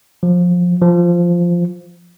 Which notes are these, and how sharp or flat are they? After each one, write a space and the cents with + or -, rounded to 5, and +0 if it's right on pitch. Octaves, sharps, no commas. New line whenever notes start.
F3 +20
F3 -5